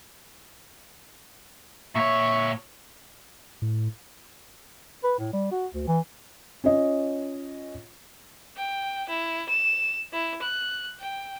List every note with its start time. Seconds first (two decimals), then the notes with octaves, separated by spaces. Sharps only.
1.95 A#2 C#5 E5 C#6
3.62 A2
5.04 B4
5.19 A2
5.33 G3
5.52 F#4
5.74 D2
5.87 E3
6.64 C#4 F4 C#5 D#5
8.56 G5
9.09 E4
9.49 E7
10.13 E4
10.42 F#6
10.99 G5